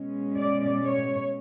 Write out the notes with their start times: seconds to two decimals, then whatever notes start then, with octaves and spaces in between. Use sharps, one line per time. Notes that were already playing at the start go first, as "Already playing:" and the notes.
Already playing: B2 G#3 C#4
0.37 D5
0.85 C#5